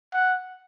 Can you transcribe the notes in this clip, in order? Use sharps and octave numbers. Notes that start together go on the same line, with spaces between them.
F#5